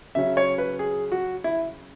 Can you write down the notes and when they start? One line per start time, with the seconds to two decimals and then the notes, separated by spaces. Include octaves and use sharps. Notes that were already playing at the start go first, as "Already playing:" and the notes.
0.15 C#3 F#3 C#4 E5
0.37 C#5
0.58 B4
0.79 G#4
1.12 F#4
1.44 E4